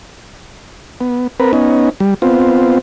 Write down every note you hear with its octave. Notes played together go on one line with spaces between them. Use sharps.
B3
C4 A#4 B4
B3 C#4 D#4
G3
B3 C4 F4